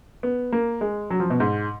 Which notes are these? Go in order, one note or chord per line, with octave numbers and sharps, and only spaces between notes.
B3
A#3
G#3
F#3
F3
B2
G#2